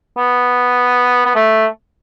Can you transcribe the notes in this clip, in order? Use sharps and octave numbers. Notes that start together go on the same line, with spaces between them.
B3
B3
A3